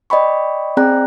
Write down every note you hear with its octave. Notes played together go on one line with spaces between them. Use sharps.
D5 D#5 G5 B5 C#6
C4 G#4 D5 G5 A#5 F#6